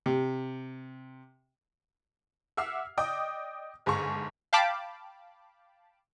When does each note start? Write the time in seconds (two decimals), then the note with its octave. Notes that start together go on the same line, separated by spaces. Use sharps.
0.06 C3
2.57 E5 F#5 D6 E6 F6 C7
2.97 D5 D#5 G5 D6 D#6
3.86 G1 G#2 G#4 A5 C#6
4.53 F5 G5 A5 B5 D6